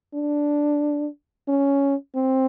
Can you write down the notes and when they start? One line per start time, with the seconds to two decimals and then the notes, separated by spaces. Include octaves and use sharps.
0.14 D4
1.48 C#4
2.15 C4